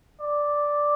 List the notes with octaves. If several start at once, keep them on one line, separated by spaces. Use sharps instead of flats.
D5